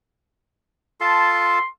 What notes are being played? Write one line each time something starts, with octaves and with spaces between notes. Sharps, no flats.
F4 A4 A5 C6